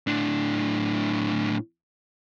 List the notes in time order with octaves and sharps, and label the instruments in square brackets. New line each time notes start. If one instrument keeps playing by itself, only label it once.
[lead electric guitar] A2 D4